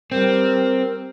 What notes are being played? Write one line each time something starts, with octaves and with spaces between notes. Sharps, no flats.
G3 C4 A#4